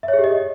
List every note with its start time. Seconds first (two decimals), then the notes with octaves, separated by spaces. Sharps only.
0.03 E5
0.08 C#5
0.13 G#4
0.19 G4
0.24 D#5